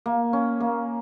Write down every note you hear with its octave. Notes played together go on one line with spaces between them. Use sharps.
A#3
C#4
A#3